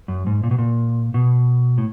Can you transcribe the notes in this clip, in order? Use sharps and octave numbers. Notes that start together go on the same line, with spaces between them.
F#2
G#2
A#2
B2
A#2
B2
A2